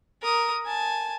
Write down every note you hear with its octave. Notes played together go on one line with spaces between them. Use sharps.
A#4 D#6
G#5 A5